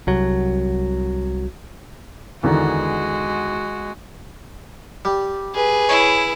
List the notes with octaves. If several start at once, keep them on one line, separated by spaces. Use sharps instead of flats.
C2 F#3
E2 D3 D#3 G#3 F#4
G3
G#4 B4
E4 C#5